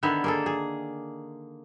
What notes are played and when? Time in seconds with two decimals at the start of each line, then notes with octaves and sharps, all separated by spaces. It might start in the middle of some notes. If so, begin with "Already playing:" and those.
0.03 D3 D#3 B3 E5
0.24 A#3 G#4 A4
0.46 G#4